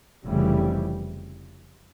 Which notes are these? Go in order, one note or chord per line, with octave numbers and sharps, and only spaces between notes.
F1 F2 C#3 E3 G3